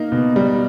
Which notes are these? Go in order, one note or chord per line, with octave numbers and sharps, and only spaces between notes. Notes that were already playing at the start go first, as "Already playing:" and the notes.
Already playing: A#3 D#4
B2
G3